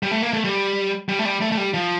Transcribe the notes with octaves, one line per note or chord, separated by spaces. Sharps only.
G3
A3
A#3
A3
G3
G3
A3
G3
A3
A3
G3
F3